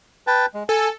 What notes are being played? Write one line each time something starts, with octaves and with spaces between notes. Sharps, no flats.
B4 G5 A5
G#3
A4 G#5